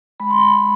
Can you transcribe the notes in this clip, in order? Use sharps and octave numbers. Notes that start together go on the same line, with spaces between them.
G#3 B5
C6
B5